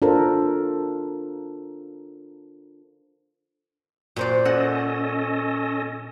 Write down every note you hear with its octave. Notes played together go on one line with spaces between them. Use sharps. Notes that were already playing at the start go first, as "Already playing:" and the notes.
D4 F4 A4 A#4 C5
A#2 F#4 C5 D5
C#4 A4 D#5 F#5